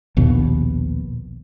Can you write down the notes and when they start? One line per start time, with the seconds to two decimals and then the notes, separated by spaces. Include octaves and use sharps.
0.17 A#1 D#2 B2